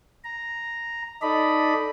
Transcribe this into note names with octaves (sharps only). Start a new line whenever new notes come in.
A#5
D#4 A4 D5 D#5 B5